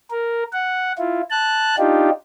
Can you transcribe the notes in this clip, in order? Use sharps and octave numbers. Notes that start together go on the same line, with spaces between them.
A#4
F#5
E4 F4
A5 F#6
D4 D#4 F4 G4